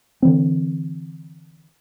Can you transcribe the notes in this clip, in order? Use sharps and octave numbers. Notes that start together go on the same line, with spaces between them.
D3 E3 C4